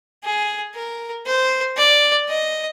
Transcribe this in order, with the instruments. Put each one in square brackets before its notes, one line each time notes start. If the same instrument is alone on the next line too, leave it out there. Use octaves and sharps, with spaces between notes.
[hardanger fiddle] G#4
A#4
C5
D5
D#5